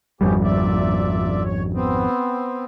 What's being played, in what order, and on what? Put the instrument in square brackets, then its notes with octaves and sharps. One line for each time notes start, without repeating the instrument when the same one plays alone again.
[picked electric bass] G#1 F2 G3 [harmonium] B3 C#4 G4
[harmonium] A#2 D5 E5
C#5
B3 C4